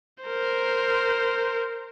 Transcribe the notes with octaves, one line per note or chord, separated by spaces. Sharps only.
A#4 C5